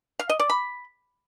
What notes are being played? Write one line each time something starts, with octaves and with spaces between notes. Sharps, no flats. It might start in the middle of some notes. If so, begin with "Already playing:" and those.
F5
D#5
D5
B5